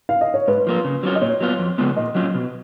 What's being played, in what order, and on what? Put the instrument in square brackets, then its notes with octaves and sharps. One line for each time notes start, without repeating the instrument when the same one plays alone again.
[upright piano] F5
D#5
C#5
[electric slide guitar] G#2 [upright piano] B4
[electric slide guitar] F3 A#3 F4
C#3
F#3 C#4 F4
[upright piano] D#5
[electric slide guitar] A#2 [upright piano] C#5
[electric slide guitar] F#3 B3 F4
F2
C#3 G#3 B3 F4
[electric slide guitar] A#2 [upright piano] D#5
[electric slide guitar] F#3 C#4 F4
B2